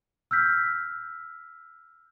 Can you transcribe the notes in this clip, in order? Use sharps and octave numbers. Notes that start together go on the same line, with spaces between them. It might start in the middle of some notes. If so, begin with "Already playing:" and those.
E6 F6 G6 B6